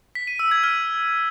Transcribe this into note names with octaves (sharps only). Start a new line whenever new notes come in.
B6
D#7
E6
G#6
F6